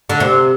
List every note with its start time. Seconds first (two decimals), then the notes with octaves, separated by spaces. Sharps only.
0.09 D3
0.20 C3